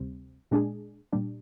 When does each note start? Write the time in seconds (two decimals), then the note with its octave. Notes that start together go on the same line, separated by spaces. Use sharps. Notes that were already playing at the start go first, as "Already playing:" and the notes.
Already playing: D2 C3 G3 C4
0.51 A#2 G#3 D4 G#4
1.13 A#2 G3 D4